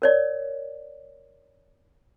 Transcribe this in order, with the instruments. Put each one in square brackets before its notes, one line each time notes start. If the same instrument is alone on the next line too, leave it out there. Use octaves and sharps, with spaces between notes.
[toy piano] A#4 C#5 D5